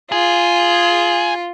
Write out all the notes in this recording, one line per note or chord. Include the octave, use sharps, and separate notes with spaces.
F4 G#4